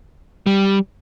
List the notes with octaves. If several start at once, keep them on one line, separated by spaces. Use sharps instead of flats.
G3